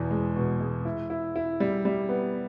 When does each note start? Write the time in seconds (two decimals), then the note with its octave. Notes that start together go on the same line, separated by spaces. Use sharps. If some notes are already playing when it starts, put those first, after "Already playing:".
Already playing: E2 B2
0.11 G#3
0.36 B2
0.60 G#3
0.85 E4
1.10 E4
1.36 E4
1.60 G3
1.85 G3
2.09 B3